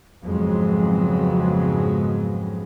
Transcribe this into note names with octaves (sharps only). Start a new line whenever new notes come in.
G#1 F2 C#3 F#3 G#3 B3